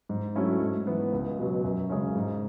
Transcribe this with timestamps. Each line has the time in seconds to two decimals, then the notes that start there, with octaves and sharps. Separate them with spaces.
0.09 G#2
0.35 F#3 A3 C#4 E4
0.60 G#2
0.87 E3 B3
1.13 C#2
1.38 B2 F#3
1.64 F#2
1.89 C#3 G#3 C#4
2.15 G#2